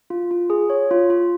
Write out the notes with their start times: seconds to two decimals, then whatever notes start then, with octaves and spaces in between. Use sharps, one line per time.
0.10 F4
0.31 F4
0.50 G#4
0.70 C#5
0.91 F4
1.10 F4